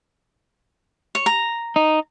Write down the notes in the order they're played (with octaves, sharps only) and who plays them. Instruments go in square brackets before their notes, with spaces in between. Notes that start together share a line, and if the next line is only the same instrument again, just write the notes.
[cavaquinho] C#5
A#5
[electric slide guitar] D#4